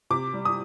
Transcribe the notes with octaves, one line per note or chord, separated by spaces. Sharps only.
C3 D6
G3
D#6